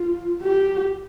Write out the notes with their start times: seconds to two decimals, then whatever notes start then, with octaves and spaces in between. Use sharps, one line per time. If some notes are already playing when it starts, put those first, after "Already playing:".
Already playing: F4
0.42 G4